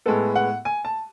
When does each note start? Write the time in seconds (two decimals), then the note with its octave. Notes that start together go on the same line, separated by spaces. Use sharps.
0.06 A2 G#3 B3 A4
0.36 F#5
0.65 G#5
0.85 A5